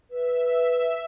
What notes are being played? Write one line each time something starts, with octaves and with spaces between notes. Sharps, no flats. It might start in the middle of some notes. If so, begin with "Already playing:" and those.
B4 E5